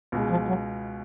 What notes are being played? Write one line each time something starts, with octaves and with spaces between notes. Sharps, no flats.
C#2 B2 G#3
F3
F#3